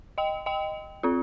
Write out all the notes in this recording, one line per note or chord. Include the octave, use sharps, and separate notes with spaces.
D#5 G5
D#5 G5
C4 F4